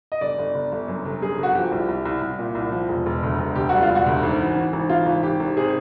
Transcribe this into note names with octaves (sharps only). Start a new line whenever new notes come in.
D#5
G1 D5
G1
G1
G1
F#2
G1
F#2 G#4
G1 F#4
F3 G4
C2
C2
C2
C2
A#2
C2
F3
E1
E1
D2
E1
D2 G4
G3 F#4
F4
E1
F#4
D2
G#1
E3
E3
G#1
E3 F4
G#1
G#1 G4
G#1
C3 G#4